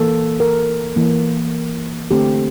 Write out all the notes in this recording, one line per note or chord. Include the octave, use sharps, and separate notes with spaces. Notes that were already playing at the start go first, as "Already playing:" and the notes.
Already playing: E3 A#3 A4
A#4
E3 A#3
D3 A3 C4 G4